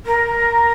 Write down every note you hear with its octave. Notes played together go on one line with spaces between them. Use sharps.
A#4